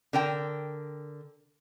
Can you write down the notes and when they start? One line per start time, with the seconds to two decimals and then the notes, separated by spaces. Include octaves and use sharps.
0.13 D3 A#4 G5